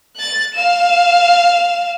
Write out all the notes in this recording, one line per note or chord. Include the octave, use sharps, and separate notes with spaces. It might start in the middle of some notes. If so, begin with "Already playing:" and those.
F#6 A6
F5 E7